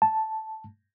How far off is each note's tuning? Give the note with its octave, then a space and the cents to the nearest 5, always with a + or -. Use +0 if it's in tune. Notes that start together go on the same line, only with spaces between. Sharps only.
A5 -5